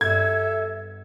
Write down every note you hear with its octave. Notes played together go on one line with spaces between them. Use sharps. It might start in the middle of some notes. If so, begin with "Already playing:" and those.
G2 B3 A4 E5 G#6